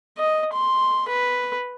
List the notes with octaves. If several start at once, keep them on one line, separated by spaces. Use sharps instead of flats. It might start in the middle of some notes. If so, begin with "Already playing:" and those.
D#5
C6
B4